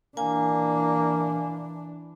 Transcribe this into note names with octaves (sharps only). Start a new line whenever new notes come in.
E3 A#3 D4 G#5